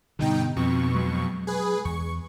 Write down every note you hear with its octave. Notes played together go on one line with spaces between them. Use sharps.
G2 B2 D3 D#4 G5
F2 B2 C4 C#6
F#3 G#3
G#4 B4
E2 C#6